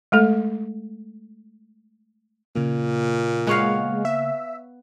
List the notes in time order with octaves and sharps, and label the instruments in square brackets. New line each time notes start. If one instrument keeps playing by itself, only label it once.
[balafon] G#3 A3 A4
[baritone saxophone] A#2 [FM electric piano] C#3 A#3
[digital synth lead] G#3 [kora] B3 C#5 F5
[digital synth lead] E5